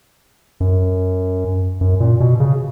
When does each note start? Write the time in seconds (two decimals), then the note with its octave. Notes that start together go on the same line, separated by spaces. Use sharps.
0.60 F#2
1.81 F#2
2.00 A#2
2.20 B2
2.40 C#3